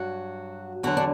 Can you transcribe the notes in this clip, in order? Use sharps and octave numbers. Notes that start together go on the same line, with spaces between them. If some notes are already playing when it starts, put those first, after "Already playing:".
Already playing: G2 F#3 F#4
E2 D3 F#3 F#4
D4